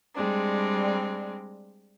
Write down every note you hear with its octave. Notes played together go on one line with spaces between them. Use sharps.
G3 G#3 C4 D4